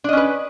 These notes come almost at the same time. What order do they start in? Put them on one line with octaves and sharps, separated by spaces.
D4 D#5 C#4 B4